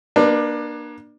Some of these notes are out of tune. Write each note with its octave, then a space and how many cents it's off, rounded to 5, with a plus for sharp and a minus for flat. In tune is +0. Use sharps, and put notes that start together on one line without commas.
A#3 +30 D4 +25 B4 +0